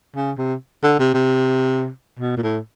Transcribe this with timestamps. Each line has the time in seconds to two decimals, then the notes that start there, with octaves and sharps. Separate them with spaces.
0.16 C#3
0.38 C3
0.83 D3
0.99 C3
1.14 C3
2.19 B2
2.37 A#2
2.43 A2